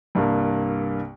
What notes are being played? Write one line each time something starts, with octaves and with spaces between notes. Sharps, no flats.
C2 G2 A#3